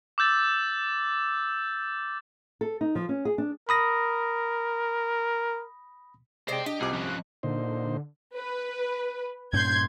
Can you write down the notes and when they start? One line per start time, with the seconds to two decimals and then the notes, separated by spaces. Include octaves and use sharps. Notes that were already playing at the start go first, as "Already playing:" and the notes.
0.18 D6 E6 G6 A6
2.61 A4
2.81 D#4
2.95 F3
3.09 C#4
3.25 G#4
3.38 D4
3.69 A#4 B5 D#6 A#6
6.48 C3 G#3 G#4 C5 D5 G5
6.66 D4 G4 D#5
6.81 C2 C3 F4 G#4 D6
6.93 F3 C#4 F#6
7.43 A#2 D3 D#4 C5
8.35 B4
9.53 G2 A#2 C#4 C6 G6 G#6